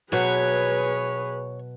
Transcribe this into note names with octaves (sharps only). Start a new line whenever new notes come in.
B2 F#3 G#4 B4 C#5